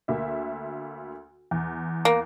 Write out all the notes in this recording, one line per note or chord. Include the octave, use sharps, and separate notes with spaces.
D2 A#3 E5
E2
A#3